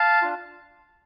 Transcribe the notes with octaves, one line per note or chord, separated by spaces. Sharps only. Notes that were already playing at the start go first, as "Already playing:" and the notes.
Already playing: F5 A5
D4 F4